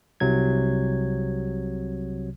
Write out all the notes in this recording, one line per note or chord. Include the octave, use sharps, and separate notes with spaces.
C2 C3 F#3 G#6